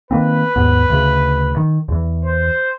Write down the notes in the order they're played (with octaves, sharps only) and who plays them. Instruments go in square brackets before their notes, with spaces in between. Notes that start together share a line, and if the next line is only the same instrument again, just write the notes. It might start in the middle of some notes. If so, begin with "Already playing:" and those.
[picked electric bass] D#3 A#3 C4 [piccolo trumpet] B4
[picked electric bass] D#2 G#2 B3
D2 C#3
D#3
E2 E3
[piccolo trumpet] C5